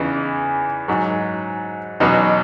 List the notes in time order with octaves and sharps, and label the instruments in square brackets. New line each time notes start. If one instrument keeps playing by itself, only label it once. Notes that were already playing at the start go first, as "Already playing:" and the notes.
Already playing: [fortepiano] E2 C#3 E3 D#4
G#2 F#3
E2 B2 F#3 D#4